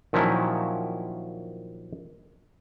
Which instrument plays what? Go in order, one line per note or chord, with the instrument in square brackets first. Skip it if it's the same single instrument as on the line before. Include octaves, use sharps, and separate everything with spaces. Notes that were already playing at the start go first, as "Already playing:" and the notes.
[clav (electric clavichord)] A#2 D#3 F3 F#3 C#4 E4